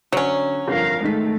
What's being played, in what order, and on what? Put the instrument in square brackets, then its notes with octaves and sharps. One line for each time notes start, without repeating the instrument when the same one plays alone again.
[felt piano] D3 [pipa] F#3 C#4
[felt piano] G1 F2 [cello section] A#4 F5
[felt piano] G#2 D#3 B6 [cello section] G#3 A3